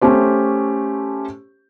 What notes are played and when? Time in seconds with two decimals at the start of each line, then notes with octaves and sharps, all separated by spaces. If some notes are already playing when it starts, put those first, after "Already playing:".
0.01 A3 C#4 G4 C5